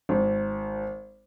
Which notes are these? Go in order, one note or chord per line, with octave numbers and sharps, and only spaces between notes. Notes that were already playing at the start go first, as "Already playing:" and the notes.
G#1